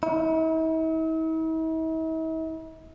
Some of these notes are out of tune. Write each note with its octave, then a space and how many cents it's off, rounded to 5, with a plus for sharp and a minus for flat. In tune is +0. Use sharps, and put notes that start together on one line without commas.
E4 -45